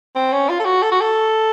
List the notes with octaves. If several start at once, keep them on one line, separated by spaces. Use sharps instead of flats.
C4
C#4
F4
A4
F#4
A4
F#4
A4